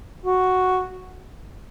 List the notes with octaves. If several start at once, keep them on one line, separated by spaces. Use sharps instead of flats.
F#4